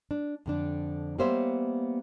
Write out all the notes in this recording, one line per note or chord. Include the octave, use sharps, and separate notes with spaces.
D4
F2 D3 D4
G3 A#3 B3 C5 C#5 E5